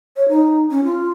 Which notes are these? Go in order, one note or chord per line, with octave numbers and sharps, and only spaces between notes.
C#5
D#4
C#4
F4